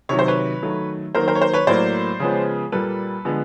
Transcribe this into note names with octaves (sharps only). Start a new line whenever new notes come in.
C3 D#3 F#3 C#5
C5
B4 C#5
D#3 F#3 A3
D#3 F#3 A#3 A#4 C5
A#4 C5
C#5
A#4 C5
B4 C#5
A2 F#3 A#3 C5 D5
C#3 F3 G#3 B3
A#2 G3 A#3 A4 B4
D3 F3 G#3 B3